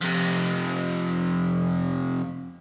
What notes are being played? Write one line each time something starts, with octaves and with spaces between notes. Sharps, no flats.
F2 C3